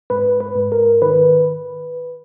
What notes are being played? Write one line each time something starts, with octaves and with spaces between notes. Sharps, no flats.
G#2 B4
B4
G#2
A#4
D#3 B4